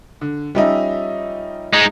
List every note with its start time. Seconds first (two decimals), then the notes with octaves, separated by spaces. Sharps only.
0.21 D3
0.55 G3 C#4 D#4 F4 D#5 E5
1.73 G#3 D#4